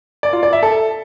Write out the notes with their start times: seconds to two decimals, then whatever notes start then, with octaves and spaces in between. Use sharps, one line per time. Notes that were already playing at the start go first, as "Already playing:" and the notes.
0.23 D5
0.33 F4
0.43 D5
0.53 E5
0.63 A4